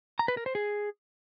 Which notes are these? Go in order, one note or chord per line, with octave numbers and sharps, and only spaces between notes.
A#5
B4
A#4
C5
G#4